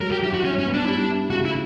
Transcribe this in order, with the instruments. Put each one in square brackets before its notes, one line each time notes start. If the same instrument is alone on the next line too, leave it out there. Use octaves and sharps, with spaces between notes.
[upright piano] F#3 [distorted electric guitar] A#4
[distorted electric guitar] G4
[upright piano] E4 [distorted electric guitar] G4
[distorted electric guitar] F#4
[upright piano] G2 [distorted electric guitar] C#4
[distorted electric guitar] C#4
[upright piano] B3
[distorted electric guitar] D4
[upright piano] G3 [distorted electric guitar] E4
[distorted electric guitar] D4
[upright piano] E4
[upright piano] C#3 [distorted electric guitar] F#4
[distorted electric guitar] E4